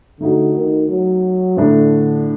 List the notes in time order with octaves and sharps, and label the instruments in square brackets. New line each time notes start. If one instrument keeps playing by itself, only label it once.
[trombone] D3 [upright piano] A3 D#4 F#4
[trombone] D#3
F#3
[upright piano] A2 A3 D4 [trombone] D3